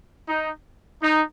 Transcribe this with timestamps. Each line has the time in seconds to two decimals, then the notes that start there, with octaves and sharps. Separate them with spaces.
0.28 D#4
1.01 D#4